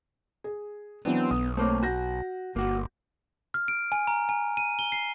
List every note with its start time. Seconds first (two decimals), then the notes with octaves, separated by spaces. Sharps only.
0.44 G#4
1.05 E3 F#3 B3 C4 D4
1.31 B1 D#6
1.57 A3 A#3 C4 C#5
1.83 F#4 G6 A#6
2.56 G1 A#3 F#4
3.54 F6
3.68 D7
3.92 G#5
4.07 A#5
4.29 G#5
4.57 D#7
4.79 G7
4.92 C7